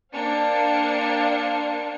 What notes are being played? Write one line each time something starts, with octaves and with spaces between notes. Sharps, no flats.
A#3 D4 C5 F5 G5 C#7